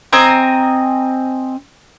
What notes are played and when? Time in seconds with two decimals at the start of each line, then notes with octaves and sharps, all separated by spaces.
0.13 C4 D#5 G#5 A#5